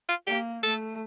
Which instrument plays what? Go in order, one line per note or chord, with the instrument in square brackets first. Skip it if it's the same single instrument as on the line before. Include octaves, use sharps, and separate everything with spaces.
[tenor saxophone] F4
[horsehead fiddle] A#3 [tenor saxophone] G4
[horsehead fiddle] A3 [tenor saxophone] A4